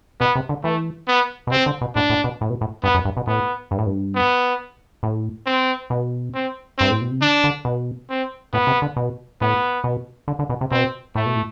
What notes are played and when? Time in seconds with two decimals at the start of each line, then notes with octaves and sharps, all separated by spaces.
0.20 B2 B3
0.35 C3
0.49 D3
0.64 E3 A3
1.08 B3
1.47 B2
1.51 C3 C4
1.66 D3
1.81 B2
1.95 A2 D4
2.10 A2
2.24 B2
2.41 A2
2.50 B2
2.61 A2
2.83 G2 B3
2.94 F#2
3.05 G2
3.17 B2
3.27 A2 B3
3.71 G2
3.78 A2
3.86 G2
4.15 B3
5.03 A2
5.46 C4
5.90 B2
6.34 C4
6.78 G2 C4
6.91 A2
7.01 B2
7.11 C3
7.21 D3 D4
7.44 D3
7.65 B2
8.10 C4
8.53 A2 B3
8.67 C3
8.82 D3
8.96 B2
9.41 A2 B3
9.84 B2
10.28 D3
10.39 D3
10.49 B2
10.61 C3
10.71 B2 C4
11.15 A2 A3
11.26 B2
11.36 A2